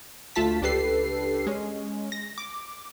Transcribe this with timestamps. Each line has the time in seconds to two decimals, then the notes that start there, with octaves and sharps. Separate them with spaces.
0.36 D2 A3 F4 A5 B6
0.62 C#2 D4 G4 A4 B4 C7
1.47 G#3 C#4
2.12 A#6
2.38 D6